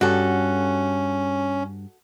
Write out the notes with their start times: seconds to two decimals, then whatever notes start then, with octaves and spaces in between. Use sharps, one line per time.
0.01 G2 C#4 F#4 A4